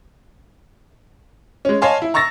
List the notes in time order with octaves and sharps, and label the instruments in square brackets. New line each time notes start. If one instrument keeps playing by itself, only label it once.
[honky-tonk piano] G#3 C#4
C#5 D#5 F5 G#5 A5 C6
E4
A#5 C#6 E6 A6 A#6